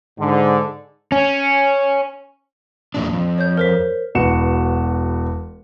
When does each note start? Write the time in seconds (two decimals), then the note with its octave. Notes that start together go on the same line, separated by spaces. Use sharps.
0.19 G#2 D3
1.12 C#4
2.94 E2 A#2 D4
3.13 F2
3.38 C#5 G6
3.57 A#4 C5 B6
4.15 E1 B3 F#4 C#7 E7